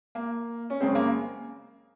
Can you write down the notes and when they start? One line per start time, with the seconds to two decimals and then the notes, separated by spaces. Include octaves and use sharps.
0.15 A#3
0.70 C#4
0.80 F#2 C#3 G#3 C4
0.95 A#3